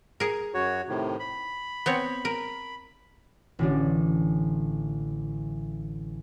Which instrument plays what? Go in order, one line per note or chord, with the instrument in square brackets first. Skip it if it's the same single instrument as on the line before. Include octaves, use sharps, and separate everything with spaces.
[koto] G#4 A#4
[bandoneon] F#2 F#4 C#5
A2 C3 D#3
B5
[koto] B3 C4 C#5
A#4
[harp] A1 D3 D4